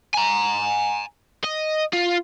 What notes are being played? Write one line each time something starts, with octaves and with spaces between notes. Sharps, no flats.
G#5 A#5
D#5
F4